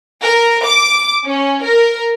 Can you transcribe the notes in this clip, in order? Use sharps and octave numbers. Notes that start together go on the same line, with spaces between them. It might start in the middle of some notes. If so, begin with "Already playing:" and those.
A#4
D6
C#4
A#4